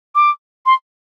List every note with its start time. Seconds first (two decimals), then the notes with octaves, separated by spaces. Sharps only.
0.15 D6
0.66 C6